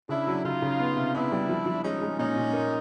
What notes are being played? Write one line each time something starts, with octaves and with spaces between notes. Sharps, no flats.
C#3 D4 E4
F#3
C#3 D#4 F4
C#3
B3
C3
B3 D4 E4
G3
F3
F3
G#3 C#4 D#4
G#3
A#2 C#4 D#4
A#2
A#3